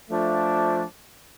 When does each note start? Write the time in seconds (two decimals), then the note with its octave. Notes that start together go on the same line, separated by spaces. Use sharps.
0.11 F3 A3 D4